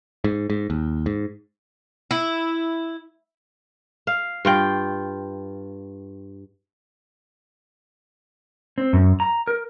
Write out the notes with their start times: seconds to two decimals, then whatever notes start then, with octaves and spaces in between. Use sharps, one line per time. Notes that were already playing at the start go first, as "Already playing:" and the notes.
0.24 G#2
0.50 G#2
0.70 D#2
1.06 G#2
2.11 E4
4.07 F5
4.45 G2 F4 G5
8.78 C4
8.93 F#2
9.20 A#5
9.47 A#4